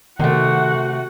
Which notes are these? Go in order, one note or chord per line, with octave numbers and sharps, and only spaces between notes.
C3 D#3 A3 F#4 F#5